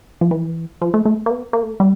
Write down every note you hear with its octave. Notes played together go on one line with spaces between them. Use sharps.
F3
E3
F3
A3
A3
A#3
B3
A#3
A3
G3